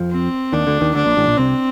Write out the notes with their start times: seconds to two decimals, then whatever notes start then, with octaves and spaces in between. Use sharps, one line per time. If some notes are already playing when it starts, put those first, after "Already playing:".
Already playing: F2 F3
0.11 C4
0.52 D#2 D#3 D4
0.67 D2 D3
0.81 D#2 D#3
0.95 D2 D3 D4
1.05 A#1 A#2
1.17 A1 A2
1.27 A#1 A#2
1.38 C2 C3 C4